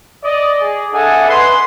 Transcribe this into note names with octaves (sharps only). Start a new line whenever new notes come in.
D5 D#5
G#4
D4 A4 D#5 E5 F#5 G#5
B4 C6